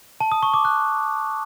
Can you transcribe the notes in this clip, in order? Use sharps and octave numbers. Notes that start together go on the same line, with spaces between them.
A5
D#6
C#6
D6
F#6